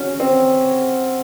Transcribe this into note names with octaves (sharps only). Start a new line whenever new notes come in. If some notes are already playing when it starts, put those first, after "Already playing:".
Already playing: C#4 F#4
C4